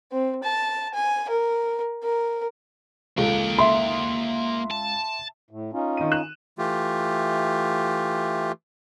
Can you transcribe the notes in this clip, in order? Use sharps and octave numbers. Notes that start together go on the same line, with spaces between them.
C4
A5
G#5
A#4
A#4
C#2 A#3 A4 G5
E5 C6
A5
A2
C#4 D#4 F4
D#3 D#7
F#6 E7
E3 A3 F4 G4